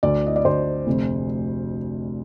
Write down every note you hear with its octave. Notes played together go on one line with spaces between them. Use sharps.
D2 D5
D#5
D5
D2 C5
F1